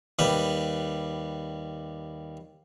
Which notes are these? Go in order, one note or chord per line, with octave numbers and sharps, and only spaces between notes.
D#2 G3 B4